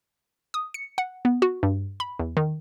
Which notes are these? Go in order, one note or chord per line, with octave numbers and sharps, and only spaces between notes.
D#6
C#7
F#5
B3
F#4
G2
B5
E2
D#3